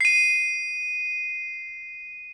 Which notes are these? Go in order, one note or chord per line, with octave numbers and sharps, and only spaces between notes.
C7 D#7